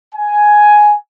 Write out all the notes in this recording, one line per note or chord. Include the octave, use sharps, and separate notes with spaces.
G#5